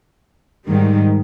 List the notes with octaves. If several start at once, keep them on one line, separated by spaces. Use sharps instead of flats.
G#2 D#3 G3